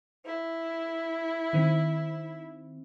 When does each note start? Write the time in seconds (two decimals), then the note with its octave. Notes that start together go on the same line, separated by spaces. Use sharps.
0.25 E4
1.53 D#3 C4